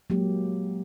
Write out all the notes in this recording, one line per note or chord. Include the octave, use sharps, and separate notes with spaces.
F#3 G#3 A#3 G4